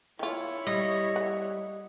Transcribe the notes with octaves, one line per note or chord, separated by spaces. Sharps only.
D#3 E4 F4 C#5
G3 D#5
F#5